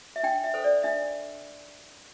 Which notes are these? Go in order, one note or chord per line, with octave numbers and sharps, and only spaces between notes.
E5
D4 G5
E5
A4 C5
D5
D4 E5